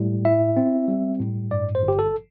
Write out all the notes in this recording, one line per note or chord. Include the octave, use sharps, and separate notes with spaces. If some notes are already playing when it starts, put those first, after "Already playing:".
Already playing: A2 G3
E4 E5
C4
G3
A2
G2 D5
C5
G1
G4
A4